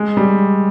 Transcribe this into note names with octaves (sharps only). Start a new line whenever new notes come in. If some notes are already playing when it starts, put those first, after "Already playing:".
Already playing: G#3
G3